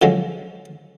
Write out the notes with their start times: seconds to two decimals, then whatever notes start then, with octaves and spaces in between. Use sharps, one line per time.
0.02 D3 F3 F#3 G#3 C#4